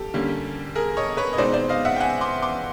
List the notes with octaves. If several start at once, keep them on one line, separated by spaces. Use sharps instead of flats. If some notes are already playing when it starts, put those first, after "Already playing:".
Already playing: G4 A4
D3 G3 A#3 C#4
G#4 A#4
C#5 D#5
B4 C#5
D#5
B2 G#3 C4 D#4 C5 D5
C5 D5
D#5 F5
E5 F#5
G5
F#5 G#5
C6 D6
C6 D6